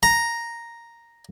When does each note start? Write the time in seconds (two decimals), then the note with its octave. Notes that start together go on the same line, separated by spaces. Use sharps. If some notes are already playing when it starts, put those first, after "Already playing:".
0.03 A#5